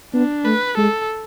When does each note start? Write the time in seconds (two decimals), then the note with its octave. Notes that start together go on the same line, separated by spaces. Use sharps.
0.13 B3 D4
0.45 A3 B4
0.77 G#3 A4